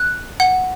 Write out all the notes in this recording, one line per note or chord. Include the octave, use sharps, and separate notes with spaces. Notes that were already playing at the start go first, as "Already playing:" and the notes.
Already playing: F#6
F#5